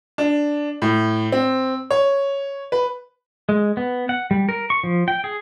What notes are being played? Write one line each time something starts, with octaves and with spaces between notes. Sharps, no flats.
D4
A2
C4
C#5
B4
G#3
B3
F#5
G3
A#4
C#6
F3
G5
G#4